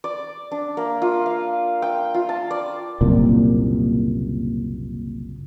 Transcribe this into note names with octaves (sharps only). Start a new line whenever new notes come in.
D5
D4
A#3
F4
F5
G5
F4
A5
D5
F#1 C2 A#2